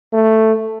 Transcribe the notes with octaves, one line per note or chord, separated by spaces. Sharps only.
A3